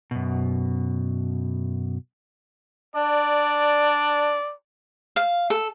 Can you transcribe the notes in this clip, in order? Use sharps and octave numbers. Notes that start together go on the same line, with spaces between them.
F#2 B2
D4 D5
F5
A4